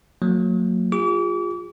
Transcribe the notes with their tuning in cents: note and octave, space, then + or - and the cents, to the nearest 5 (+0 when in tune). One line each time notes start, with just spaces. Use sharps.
F#3 -25 A#3 -40
F4 +15 G#4 -40 D6 -40